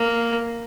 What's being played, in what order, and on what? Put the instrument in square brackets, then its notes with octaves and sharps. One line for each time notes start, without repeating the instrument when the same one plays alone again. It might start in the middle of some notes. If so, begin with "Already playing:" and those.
Already playing: [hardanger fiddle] A#3